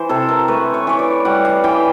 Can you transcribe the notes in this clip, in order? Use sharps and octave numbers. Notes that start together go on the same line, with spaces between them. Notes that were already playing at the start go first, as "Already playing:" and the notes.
Already playing: E3 C5
C3 A4
A#4
A3 B4
C#5
E3 C#5
D5
G3 F#5
F5
E3 G5